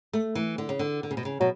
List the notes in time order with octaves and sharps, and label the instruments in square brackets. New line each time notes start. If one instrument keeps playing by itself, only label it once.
[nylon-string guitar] A3
E3
D3
C#3
D3
D3
C#3
B2
C#3
[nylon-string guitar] B2 [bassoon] F#3